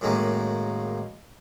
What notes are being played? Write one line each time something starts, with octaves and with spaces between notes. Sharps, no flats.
F#2 A2 D#3 G#3 A#3